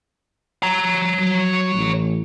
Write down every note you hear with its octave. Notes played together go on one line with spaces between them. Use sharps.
C#5 A#5
F#3
A1